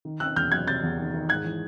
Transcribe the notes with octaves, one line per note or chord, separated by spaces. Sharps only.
D#3
D#3 E6 F#6
E2 F6 G6
F#3 F#6 G#6
C3 G6 A6
E2
D#3
D#3
G#2 F#6 G#6
E3